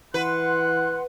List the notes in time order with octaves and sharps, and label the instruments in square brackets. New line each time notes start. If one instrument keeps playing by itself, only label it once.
[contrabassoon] E3 [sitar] B4 [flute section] F#5 C6 [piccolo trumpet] F#6